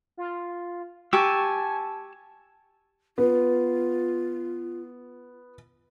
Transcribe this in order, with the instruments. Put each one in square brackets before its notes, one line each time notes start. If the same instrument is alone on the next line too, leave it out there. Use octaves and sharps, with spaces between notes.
[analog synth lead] F4
[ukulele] G4 [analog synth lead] G#5 [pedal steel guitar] A5 C#6 E6
[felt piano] B3 [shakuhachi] F4